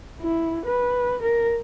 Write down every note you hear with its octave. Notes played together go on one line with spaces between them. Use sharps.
E4
B4
A#4